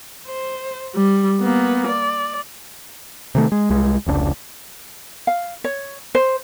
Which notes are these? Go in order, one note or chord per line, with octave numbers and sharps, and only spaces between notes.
C5
G3
A#3 B3
D5
C3 D#3 A3
G#3
C2 G#3
F1 C#2 B2 D4
F5
C#5
C5